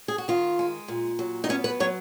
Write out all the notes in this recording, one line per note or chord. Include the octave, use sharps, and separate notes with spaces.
G#4
F#4
D#3 F4
G#3
A#2
F#3
D#4
B3 C#4
B4
F#3 C#5